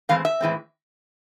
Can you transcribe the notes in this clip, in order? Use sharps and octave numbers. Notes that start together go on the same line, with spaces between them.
A2 E3 G#3 C4 F5
E5
A2 E3 G#3 C4